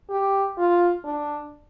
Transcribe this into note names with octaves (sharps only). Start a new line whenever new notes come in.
G4
F4
D4